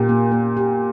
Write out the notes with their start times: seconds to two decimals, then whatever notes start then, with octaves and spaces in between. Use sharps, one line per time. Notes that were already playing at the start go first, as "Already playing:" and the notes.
Already playing: A#2 G4
0.09 A#3
0.32 A#3
0.57 G4